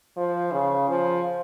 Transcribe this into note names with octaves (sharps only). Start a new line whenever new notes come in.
F3
C#3
F3